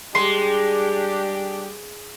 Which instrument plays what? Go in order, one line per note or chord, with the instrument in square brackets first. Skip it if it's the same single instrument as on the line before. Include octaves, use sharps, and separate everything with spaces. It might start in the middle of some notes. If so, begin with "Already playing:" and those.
[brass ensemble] G3 D4 G4 [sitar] G#3 [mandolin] C6